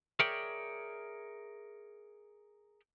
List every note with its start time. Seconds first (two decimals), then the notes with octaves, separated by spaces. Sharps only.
0.20 G#4 A#4 C#5 D5 E5 G5